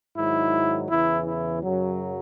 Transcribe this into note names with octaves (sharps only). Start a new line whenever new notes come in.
G#2 D#3 F#3 E4
E2 C#3 E3 E4
E4
F#2 C#3 F#3